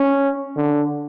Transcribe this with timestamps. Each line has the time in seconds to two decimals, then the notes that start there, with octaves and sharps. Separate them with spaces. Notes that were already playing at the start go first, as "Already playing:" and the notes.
Already playing: C#4
0.56 D3